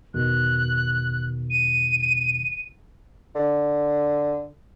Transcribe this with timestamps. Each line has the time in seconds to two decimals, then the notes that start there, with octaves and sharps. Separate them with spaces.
0.14 E2 B2 D#3 F#6
1.50 D#7
3.35 D3